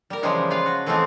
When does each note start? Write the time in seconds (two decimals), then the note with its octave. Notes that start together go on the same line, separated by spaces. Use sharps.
0.10 G3 A#4
0.23 C#3 E3 F3 G3 G#3 D#4
0.50 F4 B4 F5
0.66 F#4
0.86 E3 F3 A3 C4 D#4 F4